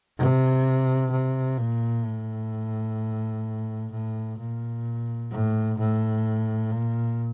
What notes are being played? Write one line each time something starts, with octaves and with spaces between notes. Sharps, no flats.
C3
C3
A#2
A2
A2
A#2
A2
A2
A#2